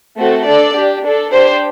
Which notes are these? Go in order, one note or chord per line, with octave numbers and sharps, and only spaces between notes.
A3 C4 F#4 A4
D4 A4 D5
D4 G4
D4 A4
D4 G4 C5